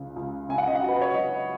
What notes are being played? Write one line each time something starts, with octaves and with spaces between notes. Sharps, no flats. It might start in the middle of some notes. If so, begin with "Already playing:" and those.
Already playing: C#2 C#3
C#2
C#3 G#5
F#5
D#5
F#5
F#3
B4
C#5
F#3 D#5